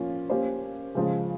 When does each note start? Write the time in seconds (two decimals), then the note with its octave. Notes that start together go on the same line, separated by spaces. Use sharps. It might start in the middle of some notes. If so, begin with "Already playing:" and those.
Already playing: F3 A#3 C#4 F4
0.30 A#3 C#4 G4 C5
0.95 C#3 F3 G#3